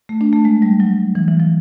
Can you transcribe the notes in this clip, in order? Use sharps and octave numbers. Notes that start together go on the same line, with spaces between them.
A3
D4
A3
G#3
G3
F#3
E3
E3
F3